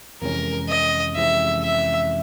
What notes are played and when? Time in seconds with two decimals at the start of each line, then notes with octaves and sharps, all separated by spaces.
0.22 F2 C3 E3 G#3 C#4 A#4
0.69 D#5
1.16 F2 C3 E3 G#3 C#4 E5
1.63 E5